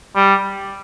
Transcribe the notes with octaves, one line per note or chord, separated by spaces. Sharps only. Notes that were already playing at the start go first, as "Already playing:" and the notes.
G3